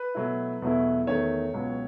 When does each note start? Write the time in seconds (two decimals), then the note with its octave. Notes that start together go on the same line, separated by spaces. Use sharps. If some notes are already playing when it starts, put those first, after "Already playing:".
Already playing: B4
0.15 B2 F#3 A3 E4
0.62 E2 B2 F#3 A3 E4
1.07 E2 D#3 A3 C#5
1.54 C#2 B2 F#3